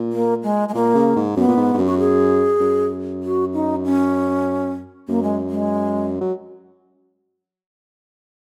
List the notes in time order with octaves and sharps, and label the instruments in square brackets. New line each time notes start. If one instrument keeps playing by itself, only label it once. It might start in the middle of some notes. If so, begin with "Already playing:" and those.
Already playing: [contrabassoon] A#2
[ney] A#3
G#3
G#3
[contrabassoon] A#2 [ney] A#3
[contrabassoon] C#3
G#2
[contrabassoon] F#2 [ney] B3
[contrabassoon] A#2
G#2
G#2
F#2
[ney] F#4
G#4
[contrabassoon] F#2
[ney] F#4
D#4
C#4
[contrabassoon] F#2 [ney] A#3
[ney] G#3
G#3
[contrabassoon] F#3